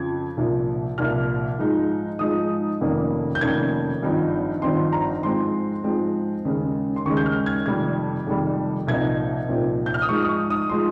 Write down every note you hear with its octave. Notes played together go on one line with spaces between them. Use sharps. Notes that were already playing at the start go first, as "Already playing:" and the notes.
Already playing: F2 C#3 F3 G#6
C2 A#2 F3
C2 A#2 F3 F6
G#2 F3 G#3 D#4
G#2 F3 G#3 D#4 D#6
F1 F2 D#3 A#3 C#4
G6
F1 F2 D#3 A#3 C#4 G#6
G#1 G2 F3 C4 D#4
G#1 G2 F3 C4 D#4 C6
A#5
G#2 F3 G#3 C4 C6
G#2 F3 G#3 C4
D#2 C#3 G#3 C#4
C6
D#2 C#3 G#3 C#4 C#6
G6
F6
G#6
F1 F2 D#3 G3 G#6
F1 F2 D#3 G3
C2 A#2 F3 C4 D#4 G#6
C2 A#2 F3 C4 D#4
G6
F6
D#6
G#2 F3 G#3 D#4 C#6
D#6
C#6
D#6
F3 G#3 D#4 C6